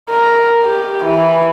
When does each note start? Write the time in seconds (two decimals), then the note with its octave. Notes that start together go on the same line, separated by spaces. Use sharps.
0.10 A#4
0.63 G4
1.04 E3